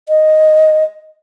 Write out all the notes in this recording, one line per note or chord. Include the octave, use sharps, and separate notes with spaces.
D#5